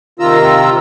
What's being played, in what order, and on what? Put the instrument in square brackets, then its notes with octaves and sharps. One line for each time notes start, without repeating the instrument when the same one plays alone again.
[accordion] C3 D#3 F4 A#5 E6